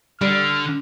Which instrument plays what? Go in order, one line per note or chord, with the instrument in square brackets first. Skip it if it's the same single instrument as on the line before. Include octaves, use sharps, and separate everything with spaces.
[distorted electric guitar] D3 [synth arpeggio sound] G3 [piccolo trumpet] F6